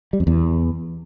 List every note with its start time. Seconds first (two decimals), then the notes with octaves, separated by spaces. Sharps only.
0.13 G3
0.20 F2
0.27 E2